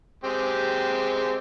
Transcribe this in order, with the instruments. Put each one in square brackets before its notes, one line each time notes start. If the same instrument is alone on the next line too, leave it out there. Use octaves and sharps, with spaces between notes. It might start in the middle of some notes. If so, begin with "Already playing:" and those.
[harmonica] G#3 C4 G4